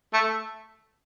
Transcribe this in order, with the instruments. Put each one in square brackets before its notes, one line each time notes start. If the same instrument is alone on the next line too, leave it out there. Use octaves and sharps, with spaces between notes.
[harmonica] A3